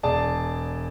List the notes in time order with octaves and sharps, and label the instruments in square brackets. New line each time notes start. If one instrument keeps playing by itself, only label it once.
[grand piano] E1 G#4 D5 A5